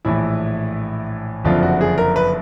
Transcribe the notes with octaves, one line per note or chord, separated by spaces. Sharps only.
A#1 A2 E3 E4
F#1 F2 D3 F3 F4
F#4
G#4
A#4
B4